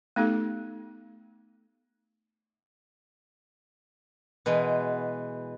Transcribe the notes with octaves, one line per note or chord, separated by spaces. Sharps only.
A3 B3 D#4 G4 A4
B2 E3 G#3 B3